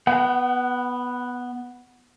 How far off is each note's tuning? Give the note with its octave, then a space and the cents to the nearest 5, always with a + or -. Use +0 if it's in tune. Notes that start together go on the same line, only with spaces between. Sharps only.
B3 +0 F#5 +35